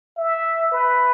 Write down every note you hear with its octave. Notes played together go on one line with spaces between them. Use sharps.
E5
B4